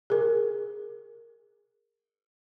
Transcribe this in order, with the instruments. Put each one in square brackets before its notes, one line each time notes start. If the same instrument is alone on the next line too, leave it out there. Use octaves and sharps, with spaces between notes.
[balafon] G#4 A#4